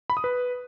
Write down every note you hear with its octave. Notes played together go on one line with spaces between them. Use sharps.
B5
D#6
B4